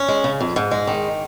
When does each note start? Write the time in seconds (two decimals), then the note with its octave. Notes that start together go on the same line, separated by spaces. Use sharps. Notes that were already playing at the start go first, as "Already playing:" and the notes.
Already playing: C#4
0.08 G#3
0.24 C#3
0.40 F2
0.56 G#2
0.71 G#3
0.87 D#3